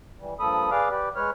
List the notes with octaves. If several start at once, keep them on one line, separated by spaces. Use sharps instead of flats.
E3 G3
G2 F3 A#3 A4 B5 D#6
G#4 B4 D5 F5 D6 F6
G4 B4 D5
G#3 B4 C#5 F6